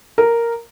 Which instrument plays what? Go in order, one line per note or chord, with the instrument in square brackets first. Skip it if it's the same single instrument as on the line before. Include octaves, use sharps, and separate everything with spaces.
[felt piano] A#4